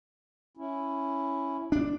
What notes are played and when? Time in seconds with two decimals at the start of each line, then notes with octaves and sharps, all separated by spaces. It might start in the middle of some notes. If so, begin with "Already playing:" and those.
0.57 C#4 E4
1.72 D4